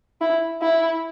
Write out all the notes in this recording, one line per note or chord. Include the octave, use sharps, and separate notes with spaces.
E4
E4